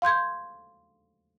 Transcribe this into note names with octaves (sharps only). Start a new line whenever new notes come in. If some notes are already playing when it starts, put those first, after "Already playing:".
F5 C6 G6 G#6